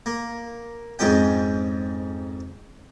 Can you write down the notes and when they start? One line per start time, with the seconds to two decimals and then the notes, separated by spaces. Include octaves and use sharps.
0.06 A#3
0.99 F2 G#2 G#3 C#4 G5